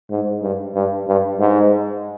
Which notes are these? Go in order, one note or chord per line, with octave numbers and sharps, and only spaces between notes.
G#2
G2
G2
G2
G#2